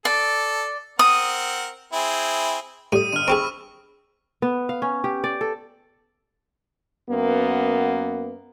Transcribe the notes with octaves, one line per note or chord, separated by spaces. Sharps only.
A4 D5
C4 A#4 F#5 D#6
C4 E4 G#4
A2 G3 D#6 D#7
G1 F6 D#7
C4 G4 G#4 B5 C#6 E6
B3
F5
C#4
G4
D5
A4
F#2 A#3 B3